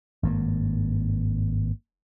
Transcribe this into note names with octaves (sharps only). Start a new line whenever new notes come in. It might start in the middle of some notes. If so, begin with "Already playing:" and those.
G#1 G2 D#3 A#3